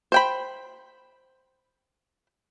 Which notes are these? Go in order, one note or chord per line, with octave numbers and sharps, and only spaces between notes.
C5 G5 B5